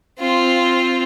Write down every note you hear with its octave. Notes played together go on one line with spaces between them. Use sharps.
C4 F4